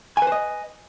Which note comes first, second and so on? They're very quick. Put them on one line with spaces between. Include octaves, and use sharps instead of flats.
G#5 B4 C5 D#5